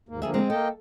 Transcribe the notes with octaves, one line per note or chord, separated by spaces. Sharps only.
D#2 G#2 A#3
D3 F3 G3 A#3 G#4 E5
G#3 C4
A#3 A4 D#5 G5